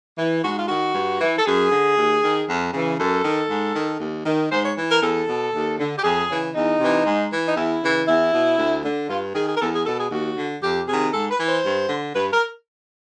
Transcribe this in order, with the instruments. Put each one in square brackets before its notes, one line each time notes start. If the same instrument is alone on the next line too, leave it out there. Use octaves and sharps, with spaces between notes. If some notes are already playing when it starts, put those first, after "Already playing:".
[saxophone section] E3
G#2 F#4
F4
D#3 F#4
G2
E3
A4
F#2 G#4
D3
D#2
D#3
F2
C#3 E3
F#2 A4
D#3
G#2
D#3
D#2
D#3
G#2 C5
C#5
E3
A#4
E2 A4
B2
D#2
D3
G4
F2 G#4
C#3 E3
E2 D#4
C3 E3
G#2
E3
D#4
E2 E4
C#3 E3
E2 E4
B2
D2
D3
G2 F4
D#3 G#4
G#4
A#4
E2 A4
G#4
B2 A4
G#4
D#2 F#4
D3
F2 G4
C3 D#3 G#4
G#2 A4
B4
E3
C5
G2
D3
G2 B4
A#4